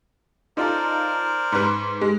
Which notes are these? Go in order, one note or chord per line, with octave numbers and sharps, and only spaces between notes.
D#4 F4 A4 A#4 C5 D5
G#2 B4
G#3